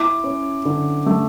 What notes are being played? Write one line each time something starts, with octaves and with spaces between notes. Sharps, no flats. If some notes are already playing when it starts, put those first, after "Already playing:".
Already playing: E4 D6
C#4
D3
A3